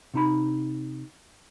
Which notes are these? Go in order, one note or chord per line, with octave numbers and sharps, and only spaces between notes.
C3 D#4 B5